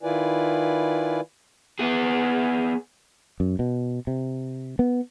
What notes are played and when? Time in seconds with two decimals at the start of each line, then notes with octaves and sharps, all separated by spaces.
0.03 D#3 E4 F4 B4 D5 G#5
1.79 B3 G#4
3.40 F#2
3.59 B2
4.07 C3
4.79 B3